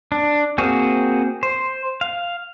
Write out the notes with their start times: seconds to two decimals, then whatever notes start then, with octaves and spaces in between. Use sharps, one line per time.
0.12 D4
0.58 A#3 C4 F#4 G#4
1.43 C5
2.01 F5